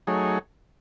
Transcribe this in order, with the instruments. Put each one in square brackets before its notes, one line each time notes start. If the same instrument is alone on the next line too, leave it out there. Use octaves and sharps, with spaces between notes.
[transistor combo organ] F#3 A3 D#4 G#4 C#5